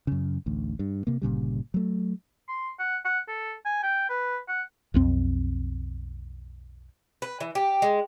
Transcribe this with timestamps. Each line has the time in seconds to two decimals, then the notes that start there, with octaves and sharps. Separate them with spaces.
0.07 F#2 C#3
0.46 A1 D2
0.79 G2
1.07 C3 A#3
1.22 G1 A#2 C#3 G3
1.74 F#3 A3
2.49 C6
2.79 F#5
3.05 F#5
3.28 A4
3.66 G#5
3.83 G5
4.10 B4
4.48 F#5
4.94 B1 F2 C4
7.22 B4
7.40 E3
7.55 G4
7.82 G#3